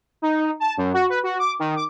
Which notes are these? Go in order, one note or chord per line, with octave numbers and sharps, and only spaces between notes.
D#4
A5
F#2
F#4
B4
F#4
D6
D#3
D6